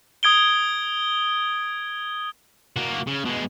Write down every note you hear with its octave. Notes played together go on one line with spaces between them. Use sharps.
D#6 G#6 D7 G7
A#3 F#4
C#3
B2 G#3